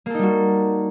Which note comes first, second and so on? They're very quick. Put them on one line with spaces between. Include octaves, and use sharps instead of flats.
A#3 A4 D#4 G3 F#4